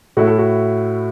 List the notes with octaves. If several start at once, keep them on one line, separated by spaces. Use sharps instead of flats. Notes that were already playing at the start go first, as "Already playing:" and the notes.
A2 A3 E4 F#4
A4
F#4